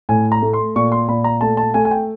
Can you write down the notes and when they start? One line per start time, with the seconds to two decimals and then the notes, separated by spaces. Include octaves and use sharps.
0.09 A2 G#5
0.32 A#5
0.42 A3
0.53 C6
0.76 A#2 C#6
0.92 C6
1.08 A#2 B5
1.24 A#5
1.41 A3 A5
1.57 A5
1.74 A3 G#5
1.85 G#5
1.91 G5